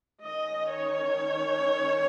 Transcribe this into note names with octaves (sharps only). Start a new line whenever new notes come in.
D#3 C#4 D#5
C#5